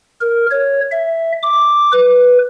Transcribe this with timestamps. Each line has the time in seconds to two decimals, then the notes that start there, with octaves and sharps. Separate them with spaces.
0.21 A#4
0.51 C#5
0.92 E5
1.43 D6
1.92 B4